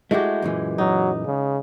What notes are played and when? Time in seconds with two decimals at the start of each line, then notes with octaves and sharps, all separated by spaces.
0.11 G#3 A3 E4 F#4 G4
0.42 F#2 A#2 E3
0.78 F#3 D#4
1.25 C#3